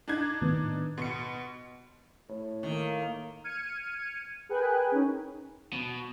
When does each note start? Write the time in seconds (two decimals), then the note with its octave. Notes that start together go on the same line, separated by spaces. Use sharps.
0.08 D4 D#4 G#6
0.41 A2 D#3 B3
0.98 B2 C6 C#7
2.29 A2
2.63 D#3 A#3
3.44 F6 G#6 C#7 D#7
4.49 G#4 A#4 B4 G5 G#5 F#6
4.92 C#4 D#4
5.73 B2